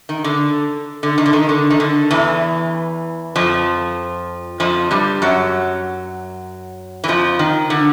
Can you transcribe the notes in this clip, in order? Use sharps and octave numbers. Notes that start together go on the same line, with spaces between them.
D#3
D3
D3
D#3
D3
D#3
D3
D#3
D3
E2 E3
F2 F3
F2 F3
G2 G3
F#2 F#3
E3
F2 F3
D#3
D3